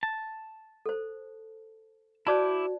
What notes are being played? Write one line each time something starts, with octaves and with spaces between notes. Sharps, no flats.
A5
A4 C5
E4 F#4 C5 D5 A5 D6 G6